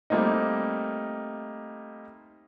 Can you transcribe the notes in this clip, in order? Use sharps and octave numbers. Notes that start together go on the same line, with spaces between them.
G3 A3 A#3 C4 D#4